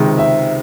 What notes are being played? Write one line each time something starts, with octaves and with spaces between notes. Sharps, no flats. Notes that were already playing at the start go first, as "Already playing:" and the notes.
Already playing: C#2 C3 D#3 G#3 C4
E5